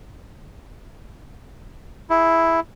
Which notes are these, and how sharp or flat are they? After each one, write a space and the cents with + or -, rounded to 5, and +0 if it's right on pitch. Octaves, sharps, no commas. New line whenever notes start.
E4 +0 G#4 +0